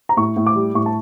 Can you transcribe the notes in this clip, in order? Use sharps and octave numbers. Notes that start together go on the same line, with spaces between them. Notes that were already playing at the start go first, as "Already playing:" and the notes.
A#5
A2 C#6
A2
D6
G3
A2 C#6
A5